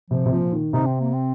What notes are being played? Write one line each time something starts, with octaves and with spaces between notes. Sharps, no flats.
C3 F3
C3
A#2 F3
D#3
C3 D#4
C4
A#3
C4